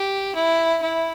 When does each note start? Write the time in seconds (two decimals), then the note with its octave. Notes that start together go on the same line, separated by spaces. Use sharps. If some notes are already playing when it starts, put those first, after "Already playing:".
Already playing: G4
0.35 E4
0.82 E4